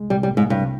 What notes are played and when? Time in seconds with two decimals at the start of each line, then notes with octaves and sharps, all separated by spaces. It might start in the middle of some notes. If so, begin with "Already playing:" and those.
Already playing: C2 G#3
0.10 C2 G3
0.23 G3
0.31 A#2
0.37 G#2
0.50 C2 G2